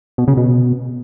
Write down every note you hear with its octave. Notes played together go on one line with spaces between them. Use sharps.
B2
C#3
B2